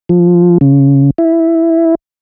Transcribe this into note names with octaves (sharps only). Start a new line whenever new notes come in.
F3
C#3
E4